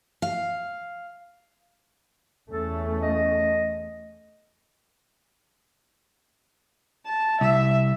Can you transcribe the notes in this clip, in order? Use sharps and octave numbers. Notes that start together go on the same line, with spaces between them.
F5
E2 A3 C#4 A4
D#5
A5
C2 E5